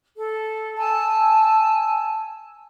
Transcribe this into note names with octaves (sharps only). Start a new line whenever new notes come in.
A4
G#5 A5 E6